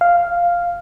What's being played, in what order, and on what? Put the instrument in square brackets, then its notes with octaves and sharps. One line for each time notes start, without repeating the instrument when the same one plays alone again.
[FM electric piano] F5